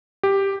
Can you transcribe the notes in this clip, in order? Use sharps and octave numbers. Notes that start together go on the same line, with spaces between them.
G4